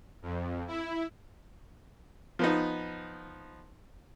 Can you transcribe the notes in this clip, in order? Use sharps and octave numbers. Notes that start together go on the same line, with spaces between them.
F2
E4
F3 B3 D#4